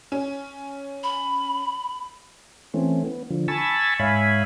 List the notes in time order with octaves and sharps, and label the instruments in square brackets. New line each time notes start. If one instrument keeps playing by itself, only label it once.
[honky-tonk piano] C#4
[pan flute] B5
[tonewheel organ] E3 A3 C4 C#4
B3
D3 F3
G#5 A5 B5 C#6 E6 A6
G#2 C#5 E5 F5 G#5 B5